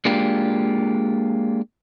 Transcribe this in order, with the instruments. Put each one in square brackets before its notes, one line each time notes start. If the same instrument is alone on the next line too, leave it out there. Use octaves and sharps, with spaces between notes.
[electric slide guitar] G#3 A#3 D4 F4 G4